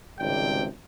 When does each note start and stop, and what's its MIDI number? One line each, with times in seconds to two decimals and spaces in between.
0.19 0.66 32
0.19 0.66 37
0.19 0.66 48
0.19 0.66 55
0.19 0.66 79